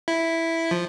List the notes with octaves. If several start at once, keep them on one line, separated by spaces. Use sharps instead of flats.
E4
F3